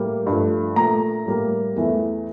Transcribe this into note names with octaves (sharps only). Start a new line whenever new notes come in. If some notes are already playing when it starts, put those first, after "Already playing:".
Already playing: A2 G3 A#3
G2 F3 A3
A#2 A3 A#5
A2 G3 A#3
E2 E3 A3